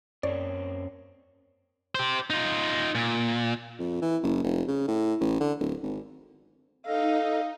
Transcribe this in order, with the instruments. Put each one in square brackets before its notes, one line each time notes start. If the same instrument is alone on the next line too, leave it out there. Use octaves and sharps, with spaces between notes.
[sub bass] F#2 [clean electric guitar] C#3 A#3 C4 [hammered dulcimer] C#5 [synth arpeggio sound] D5
[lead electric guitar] G4 C5
D#4 F4
A#2
[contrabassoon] F2
E3
F#1
F1
C#3
A2
A1
D3
D1
G#1
[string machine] D#4 [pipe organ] A4 D#5 [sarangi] F5